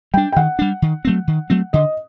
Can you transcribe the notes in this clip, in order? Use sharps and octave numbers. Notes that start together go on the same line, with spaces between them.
G3 D4 G5
G5
D#3 F#5
G3 D4
D#3
F#3 A3 C4
D#3
F#3 A3 C4
D3 D#5